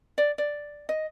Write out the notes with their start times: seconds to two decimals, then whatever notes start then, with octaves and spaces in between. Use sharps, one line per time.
0.18 D5
0.38 D5
0.89 D#5